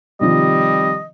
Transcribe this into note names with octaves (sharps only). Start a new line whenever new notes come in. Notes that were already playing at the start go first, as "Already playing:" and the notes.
C3 D#3 F3 G3 D#5